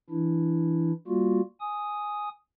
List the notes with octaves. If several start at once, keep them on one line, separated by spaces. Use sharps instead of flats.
E3 D4 E4
G3 A#3 F4 F#4
G#5 D#6